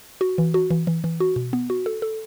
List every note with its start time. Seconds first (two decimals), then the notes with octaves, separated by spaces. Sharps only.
0.21 F#4
0.38 E3
0.54 F#4
0.70 E3
0.87 E3
1.04 E3
1.20 F#4
1.36 B2
1.53 B3
1.70 F#4
1.86 A4
2.02 A4